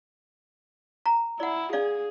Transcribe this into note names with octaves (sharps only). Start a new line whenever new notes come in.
A#5
E4 D5 F#5
D4 G#4 D5 F5